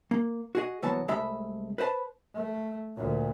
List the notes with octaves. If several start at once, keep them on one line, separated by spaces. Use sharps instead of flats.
A#3
F#4 G#4 D#5
C2 E3 F#3 B3 A5
C2 G#3 A3 E5 B5
B4 C5 D#5 A5 B5
A3
D2 A#2